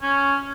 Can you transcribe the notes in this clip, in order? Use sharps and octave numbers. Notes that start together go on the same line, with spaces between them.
C#4